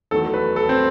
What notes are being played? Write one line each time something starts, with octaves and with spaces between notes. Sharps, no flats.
E2 D#3 F#3 A3 A4
B4
A4
C4